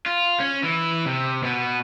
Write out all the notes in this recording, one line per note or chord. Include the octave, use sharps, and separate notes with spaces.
F4
C#4
E3 E4
C3
B2 B3